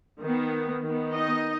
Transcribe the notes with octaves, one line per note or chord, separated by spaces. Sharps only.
D#3 B3
D#3 B3
D#4 D#5